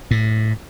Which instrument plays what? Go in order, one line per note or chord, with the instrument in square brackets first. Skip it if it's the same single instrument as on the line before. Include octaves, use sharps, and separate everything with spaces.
[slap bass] A2